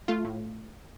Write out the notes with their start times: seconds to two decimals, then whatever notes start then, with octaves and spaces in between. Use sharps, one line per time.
0.08 A3 F4
0.25 A2